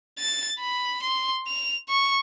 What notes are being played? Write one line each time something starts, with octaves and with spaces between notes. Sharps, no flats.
A6
B5
C6
F7
C#6